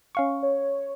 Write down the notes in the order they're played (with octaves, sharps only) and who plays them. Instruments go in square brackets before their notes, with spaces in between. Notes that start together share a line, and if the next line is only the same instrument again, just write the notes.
[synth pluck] C#4 F5 C#6
[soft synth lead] C#5